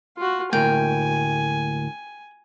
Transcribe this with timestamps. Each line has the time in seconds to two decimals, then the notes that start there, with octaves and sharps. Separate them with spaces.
0.17 F4 F#4
0.53 D2 A2 A#3 G5 G#5